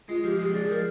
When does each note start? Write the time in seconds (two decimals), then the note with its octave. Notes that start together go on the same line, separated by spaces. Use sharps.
0.09 G#3 F4
0.24 F3 G4
0.39 G#3 G4
0.54 D4 G#4
0.69 F3 A#4